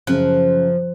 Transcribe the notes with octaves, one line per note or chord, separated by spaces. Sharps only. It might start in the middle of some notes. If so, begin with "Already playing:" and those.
F#2 C#3 F3 F#6